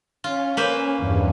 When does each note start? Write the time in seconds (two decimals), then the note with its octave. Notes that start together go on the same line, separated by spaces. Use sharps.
0.24 C#4 F4
0.57 A#3 B4 C5
0.98 E2 G2